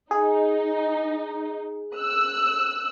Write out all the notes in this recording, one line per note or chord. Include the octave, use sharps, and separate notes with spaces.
D#4 G#4
E6 F#6